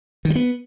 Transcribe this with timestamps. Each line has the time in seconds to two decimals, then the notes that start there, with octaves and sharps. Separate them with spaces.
0.25 D#3
0.30 G3
0.35 B3